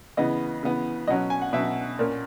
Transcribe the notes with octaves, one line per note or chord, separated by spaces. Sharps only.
C#3 E3 B3 D#5
C#3 E3 B3
B2 F#3 C#4 D#5
G#5
F#5
B2 F#3 C#4 E5
A#2 A#3 C#4